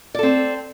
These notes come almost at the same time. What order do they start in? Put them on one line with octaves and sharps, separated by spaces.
D5 A4 C4